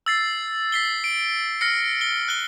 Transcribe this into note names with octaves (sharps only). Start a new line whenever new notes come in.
E6 A6 C7
B6 C7 G7
D7
F6 A#6 C#7
G7
F#6 G7